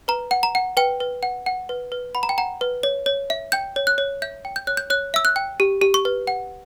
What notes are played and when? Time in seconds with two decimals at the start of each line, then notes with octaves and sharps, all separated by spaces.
0.08 B4 A#5
0.31 F#5
0.43 A#5
0.55 F#5
0.77 B4 G5
1.00 B4
1.23 F#5
1.46 F#5
1.69 B4
1.92 B4
2.15 F#5 B5
2.23 A#5
2.29 G5
2.38 F#5 A#5
2.61 B4
2.83 C#5
3.06 C#5
3.30 E5
3.52 G5 G6
3.76 C#5
3.87 F#6
3.98 C#5
4.22 E5 G6
4.45 G5
4.56 G6
4.67 C#5 F#6
4.77 G6
4.90 C#5 F#6
5.14 E5 E6
5.25 F#6
5.36 G5
5.60 G4
5.82 G4
5.94 C#6
6.05 B4
6.27 F#5